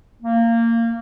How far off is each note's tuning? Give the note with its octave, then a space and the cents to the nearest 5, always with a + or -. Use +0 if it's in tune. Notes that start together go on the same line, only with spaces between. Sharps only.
A#3 -20